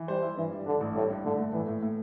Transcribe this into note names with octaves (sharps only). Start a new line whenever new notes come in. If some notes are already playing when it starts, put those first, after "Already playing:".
Already playing: E3
G3 C5
E4
G2 E3
G3
D3 D4
A1
A2 G3
G2
A2 D3
A3
A2 E3
A2
A2